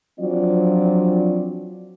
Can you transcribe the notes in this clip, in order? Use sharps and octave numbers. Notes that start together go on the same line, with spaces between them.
F3 F#3 C4 D4 F4 D5